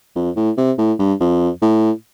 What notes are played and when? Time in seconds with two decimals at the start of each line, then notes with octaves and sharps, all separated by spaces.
0.16 F2
0.36 A2
0.57 C3
0.78 A2
0.99 G2
1.20 F2
1.62 A2